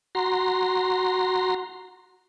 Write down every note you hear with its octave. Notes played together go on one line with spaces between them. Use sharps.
F#4 A#5 C6